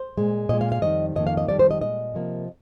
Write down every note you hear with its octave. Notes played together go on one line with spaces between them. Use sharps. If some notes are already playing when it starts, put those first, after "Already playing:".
Already playing: C5
A#2 G#3
A#2 G#3 D#5
F5
F5
F2 D#3 G3 D#5
F2 D#3 A#3 D#5
F5
D#5
F2 D#3 G3 D5
C5
D#5
A#2 G#3 D#5
C3 F3 A#3